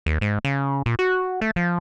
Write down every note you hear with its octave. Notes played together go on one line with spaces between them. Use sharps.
D#2
G#2
C#3
A#2
F#4
A3
F3